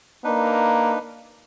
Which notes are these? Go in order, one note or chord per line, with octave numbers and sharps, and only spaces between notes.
A#3 D4 D#4 B4